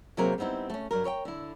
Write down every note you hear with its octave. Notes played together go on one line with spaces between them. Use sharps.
C3 F#3 A#3 C4 G#4 A#4
G3 B3 C4 D#4 E4
A3 C#4
G2 F#3 A#4
A#4 C#5 D#5 G5
D3 E4